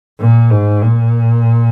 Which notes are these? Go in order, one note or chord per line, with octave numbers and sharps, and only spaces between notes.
A#2
G#2
A#2